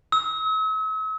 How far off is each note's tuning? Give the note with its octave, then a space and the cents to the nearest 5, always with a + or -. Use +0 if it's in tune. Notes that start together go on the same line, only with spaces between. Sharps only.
E6 -45